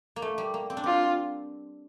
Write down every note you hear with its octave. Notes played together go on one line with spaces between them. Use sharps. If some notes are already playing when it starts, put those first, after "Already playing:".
A#3
A3
G3
A#3
C4
D4
C4 F4